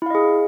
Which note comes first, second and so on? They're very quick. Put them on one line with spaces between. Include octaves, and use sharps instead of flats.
E4 F5 D#5 G#4